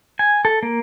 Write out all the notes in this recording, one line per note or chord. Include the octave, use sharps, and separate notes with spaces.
G#5
A4
A#3